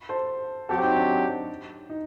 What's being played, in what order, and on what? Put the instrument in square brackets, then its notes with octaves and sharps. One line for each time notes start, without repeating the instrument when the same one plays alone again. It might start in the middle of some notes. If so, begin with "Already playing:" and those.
[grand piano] A4 C5
[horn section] F#3 C4 G4 [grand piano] F#4 A4
[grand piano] D#4
D4
D#4